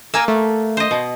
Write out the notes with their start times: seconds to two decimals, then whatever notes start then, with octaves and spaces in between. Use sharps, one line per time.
0.14 A#3 A#4 G#5 E6
0.28 A3
0.77 C5 D#5
0.91 B2